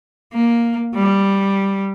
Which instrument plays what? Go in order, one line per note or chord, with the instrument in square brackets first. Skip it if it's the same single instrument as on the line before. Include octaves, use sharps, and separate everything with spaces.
[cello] A#3
G3